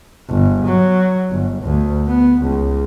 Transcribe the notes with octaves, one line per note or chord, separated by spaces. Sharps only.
G1
F#3
G1
D2
B3
C#2